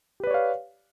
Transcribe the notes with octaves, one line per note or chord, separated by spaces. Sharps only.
G4 B4 C#5 D5 F5